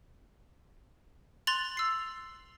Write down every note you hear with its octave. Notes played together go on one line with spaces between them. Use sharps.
C6 F#6 A6 F7 F#7
E6 C7